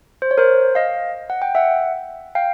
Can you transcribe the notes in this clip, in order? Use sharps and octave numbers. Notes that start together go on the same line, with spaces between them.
C5
C#5
A#4 C5
D#5 F5
F#5
G5
E5 F#5
F5 G5